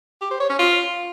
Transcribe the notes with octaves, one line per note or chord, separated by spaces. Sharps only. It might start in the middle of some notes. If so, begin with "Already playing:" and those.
G4
C5
C#5
C#4
F4